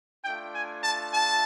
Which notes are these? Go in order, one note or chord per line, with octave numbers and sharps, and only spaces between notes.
A3 D4 F4 G5
G#5
A5
A5